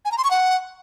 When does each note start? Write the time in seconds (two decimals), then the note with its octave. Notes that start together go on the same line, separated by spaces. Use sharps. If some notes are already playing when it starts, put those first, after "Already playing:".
0.05 G#5
0.12 A#5
0.18 C6
0.24 C#6
0.31 F#5